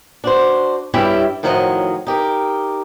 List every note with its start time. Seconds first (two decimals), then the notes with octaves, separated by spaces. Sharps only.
0.24 D4 F#4 C5
0.94 G2 G3 C#4 E4 G4 E5
1.43 A2 D#3 F3 F#3 A4 D#5
2.07 D#4 G4 A#4